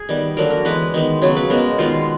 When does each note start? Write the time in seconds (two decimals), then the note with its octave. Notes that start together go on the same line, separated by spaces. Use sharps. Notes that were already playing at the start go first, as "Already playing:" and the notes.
Already playing: G#4
0.09 D#3 G3 B3
0.37 D3 F#3 A#3 A#4
0.50 A#4
0.65 E3 G#3 B3 B4
0.94 D#3 G#3 B3
1.22 C#3 F#3 B3
1.36 B4
1.50 B2 G#3 B3 A#4
1.78 D#3 G#3 B3 F4